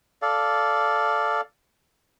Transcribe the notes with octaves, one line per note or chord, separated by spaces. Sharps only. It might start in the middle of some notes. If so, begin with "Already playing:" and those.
A4 D5 F5